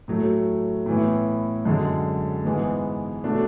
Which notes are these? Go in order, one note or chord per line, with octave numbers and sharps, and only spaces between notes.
A2 F#3 A3
A2 E3 B3 E4
F#2 D3 G#3
G#2 E3 G#3 B3
B2 A3 D4